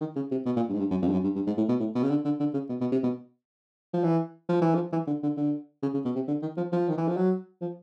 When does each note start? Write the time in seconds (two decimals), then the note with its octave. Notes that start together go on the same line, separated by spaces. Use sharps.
0.01 D#3
0.16 C#3
0.31 C3
0.46 B2
0.56 A#2
0.69 G2
0.74 G#2
0.79 G2
0.90 F#2
1.02 F2
1.08 G2
1.13 F#2
1.24 G2
1.35 G2
1.47 G#2
1.58 A2
1.69 B2
1.80 A2
1.95 B2
2.03 C#3
2.10 D3
2.25 D3
2.40 D3
2.54 C#3
2.69 B2
2.81 B2
2.92 C3
3.03 B2
3.94 F3
4.04 E3
4.49 F3
4.61 E3
4.75 F3
4.92 E3
5.07 D3
5.23 D3
5.37 D3
5.82 C#3
5.94 C#3
6.05 B2
6.15 C3
6.28 D3
6.42 D#3
6.57 F3
6.72 F3
6.89 D#3
6.97 E3
7.08 F3
7.17 F#3
7.61 F3